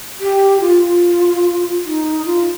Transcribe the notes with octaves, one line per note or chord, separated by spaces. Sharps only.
G4
F4
D#4
F4